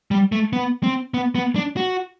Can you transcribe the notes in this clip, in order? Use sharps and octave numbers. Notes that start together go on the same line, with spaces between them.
G3
A3
B3
C4
B3
B3
D4
F#4